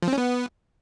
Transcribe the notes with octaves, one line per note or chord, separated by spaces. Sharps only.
F3
C4
C#4
B3